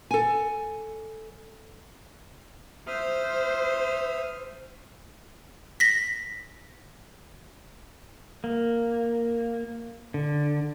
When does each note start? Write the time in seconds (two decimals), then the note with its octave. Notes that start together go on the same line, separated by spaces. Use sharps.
0.11 A4 G#5
2.87 C5 E5 D#6 F6
5.80 A#6 B6
8.44 A#3
10.14 D3